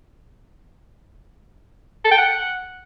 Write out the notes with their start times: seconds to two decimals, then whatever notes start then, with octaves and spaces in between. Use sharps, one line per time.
2.05 A4
2.11 G5
2.18 F#5